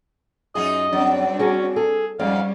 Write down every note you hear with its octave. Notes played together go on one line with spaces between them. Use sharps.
F#2 D#4 F4 G#4 D#5
F#3 G3 C4 D4
C#4 F#4 G#4 A#5
G#4 A4
F2 G#2 G3 C#4 D5 F5